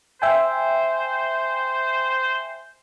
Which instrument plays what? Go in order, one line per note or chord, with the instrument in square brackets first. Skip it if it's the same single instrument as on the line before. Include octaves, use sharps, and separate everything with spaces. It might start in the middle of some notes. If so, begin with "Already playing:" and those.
[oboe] C5 [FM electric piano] E5 G5 G#5